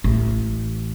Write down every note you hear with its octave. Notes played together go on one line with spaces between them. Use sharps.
A1